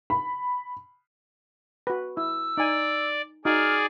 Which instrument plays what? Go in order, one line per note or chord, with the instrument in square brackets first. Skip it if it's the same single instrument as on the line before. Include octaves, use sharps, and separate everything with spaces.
[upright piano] B5
[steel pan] F#4 B4
[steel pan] E4 [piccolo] E6
[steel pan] D#4 G#5 [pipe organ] D5
[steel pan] D#4 F#4 [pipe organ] G#4 D5 [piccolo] F6